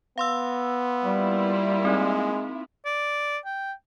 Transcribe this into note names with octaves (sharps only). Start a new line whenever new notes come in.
B3 F5 C6 E6
G3 A#3 E4 F4
G#3 C4 D#4
D5
G5